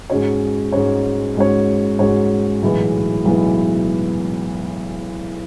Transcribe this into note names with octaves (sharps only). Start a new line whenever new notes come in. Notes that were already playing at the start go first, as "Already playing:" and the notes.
G#2 G#3 C#4 F#4 C#5
G#2 G#3 C#4 F#4 C#5
G#2 G#3 C#4 F#4 C#5
G#2 G#3 C#4 F#4 C#5
B1 A2 E3 G#3 B3
B1 A2 E3 G#3 B3